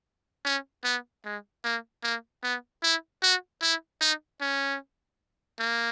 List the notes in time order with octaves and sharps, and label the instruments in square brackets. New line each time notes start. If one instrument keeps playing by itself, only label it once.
[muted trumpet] C#4
B3
G#3
A#3
A#3
B3
E4
F#4
E4
D#4
C#4
A#3